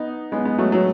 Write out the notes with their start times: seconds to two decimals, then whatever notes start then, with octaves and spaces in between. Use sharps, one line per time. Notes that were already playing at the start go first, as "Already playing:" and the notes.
Already playing: B3 D#4
0.32 G#3 B3
0.45 G#3 B3
0.58 F#3 A3
0.72 F#3